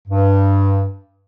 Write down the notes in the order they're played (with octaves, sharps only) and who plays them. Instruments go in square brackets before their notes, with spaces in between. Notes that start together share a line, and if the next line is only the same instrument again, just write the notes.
[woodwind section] G2